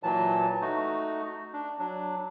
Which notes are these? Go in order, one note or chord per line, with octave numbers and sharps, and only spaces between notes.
A#2 E3 F#3 A5
A3 D#4 F#4
D4
F#3 D4